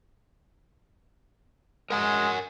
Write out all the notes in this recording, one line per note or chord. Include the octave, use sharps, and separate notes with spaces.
G#3 A#4 F#5 G#5